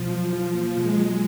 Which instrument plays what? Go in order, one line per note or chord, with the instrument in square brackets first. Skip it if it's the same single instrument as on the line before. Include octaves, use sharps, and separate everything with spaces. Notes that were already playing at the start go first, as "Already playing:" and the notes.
Already playing: [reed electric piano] B2 [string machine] F3
[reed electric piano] F#3
F4
A#3
[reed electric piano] B2 [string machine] G#3
[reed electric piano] F#3